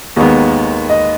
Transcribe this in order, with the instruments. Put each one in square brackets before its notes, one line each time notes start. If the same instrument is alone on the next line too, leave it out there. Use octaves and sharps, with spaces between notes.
[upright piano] D#2 D#3 G#3 B3
D#5